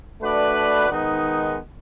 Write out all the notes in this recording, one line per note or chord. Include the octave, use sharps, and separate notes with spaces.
A3 D4 F#4 B4 D5
D#3 G#3 B3 D#4